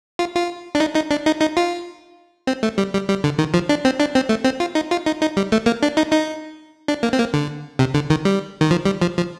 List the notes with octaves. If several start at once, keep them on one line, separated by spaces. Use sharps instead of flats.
F4
F4
D4
D#4
D#4
D4
D#4
D#4
F4
C4
A3
G3
G3
G3
D3
D#3
F3
D4
C4
D4
C4
A3
C4
F4
D#4
F4
D#4
D#4
G3
A3
A#3
D4
D#4
D#4
D4
A#3
C4
A#3
D3
C3
D3
D#3
G3
D#3
F3
G3
F3
F3